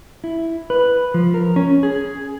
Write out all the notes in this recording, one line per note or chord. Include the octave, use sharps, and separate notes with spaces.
E4
B4
F3
A#4
C#4
G#4